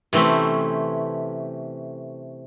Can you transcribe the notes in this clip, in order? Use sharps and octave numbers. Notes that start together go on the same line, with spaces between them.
C3 E3 A3 C4 C#4